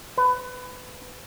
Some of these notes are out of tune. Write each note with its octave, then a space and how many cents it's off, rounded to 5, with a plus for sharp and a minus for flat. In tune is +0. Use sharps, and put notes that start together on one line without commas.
B4 +20